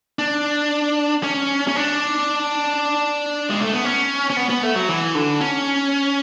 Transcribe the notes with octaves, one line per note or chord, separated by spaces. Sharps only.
D4
C#4
C#4
D4
G#3
A3
B3
C#4
C#4
B3
B3
A3
F#3
E3
D3
C#4